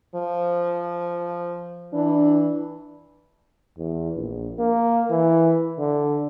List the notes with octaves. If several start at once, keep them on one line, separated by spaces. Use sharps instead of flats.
F3
E3 D4
E2
A#1
A#3
E3
D3